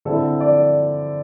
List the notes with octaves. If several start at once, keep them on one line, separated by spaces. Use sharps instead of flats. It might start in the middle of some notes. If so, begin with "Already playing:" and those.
D3 C4 E4 A4
D5